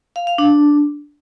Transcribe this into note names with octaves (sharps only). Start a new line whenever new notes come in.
F5
F5
D4